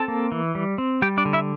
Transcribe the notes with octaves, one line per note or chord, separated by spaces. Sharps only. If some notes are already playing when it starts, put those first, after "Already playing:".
Already playing: C4 A4 A5
A#3
E3
G3
C4
G3 G4 G5
D4 D5
D3
E4 E5